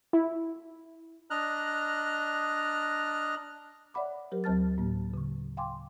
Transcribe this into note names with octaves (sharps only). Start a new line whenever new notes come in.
E4
D4 D#5 A#5 F6 F#6
C#5 D5 E5 F#5 B5 D6
F#3 G4 A#4 C5
D2 F#3 C5 A5 F6 A6
A2 A#3
C#3 C#6
F5 G5 G#5 C6 D6